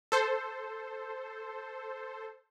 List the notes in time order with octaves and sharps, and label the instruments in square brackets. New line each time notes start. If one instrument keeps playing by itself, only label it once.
[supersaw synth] A4 C5